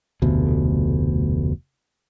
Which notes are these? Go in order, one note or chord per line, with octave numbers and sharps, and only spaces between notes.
F1 D2 B2